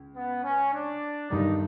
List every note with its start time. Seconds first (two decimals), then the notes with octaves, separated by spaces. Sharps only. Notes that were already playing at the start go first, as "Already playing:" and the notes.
Already playing: C#2
0.16 B3
0.44 C#4
0.73 D4
1.30 G1 G2 D#3 G3 D#4